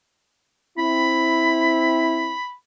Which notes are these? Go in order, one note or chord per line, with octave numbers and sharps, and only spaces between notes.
C4 E4 B5